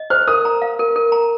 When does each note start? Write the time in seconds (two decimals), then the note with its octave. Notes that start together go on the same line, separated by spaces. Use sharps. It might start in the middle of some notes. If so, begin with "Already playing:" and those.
Already playing: D#5
0.10 C5 F6
0.28 A#4 D#6
0.45 A#5
0.62 F5
0.79 A#4
0.96 A#4
1.12 A#5